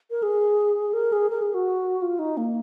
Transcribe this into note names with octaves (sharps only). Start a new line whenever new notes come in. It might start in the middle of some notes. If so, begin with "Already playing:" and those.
A#4
G#4
A#4
G#4
A#4
G#4
F#4
F4
D#4
A#3